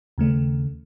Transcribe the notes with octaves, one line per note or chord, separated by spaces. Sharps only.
D#2 C#3 A3